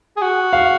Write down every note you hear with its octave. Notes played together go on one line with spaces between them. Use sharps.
G#4
F#4
F5